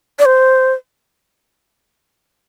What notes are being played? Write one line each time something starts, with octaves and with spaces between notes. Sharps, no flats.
D5
C5